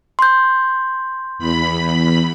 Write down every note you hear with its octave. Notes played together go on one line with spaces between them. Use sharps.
C6 G6
E2 B5